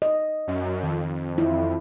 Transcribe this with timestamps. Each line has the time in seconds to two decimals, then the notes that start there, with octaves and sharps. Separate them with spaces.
0.02 D#5
0.47 F#2
0.83 F2 D#3
1.38 E4